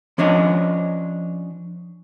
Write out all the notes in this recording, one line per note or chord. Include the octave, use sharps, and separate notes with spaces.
F3 C#4 D4 C#5 D#5 E5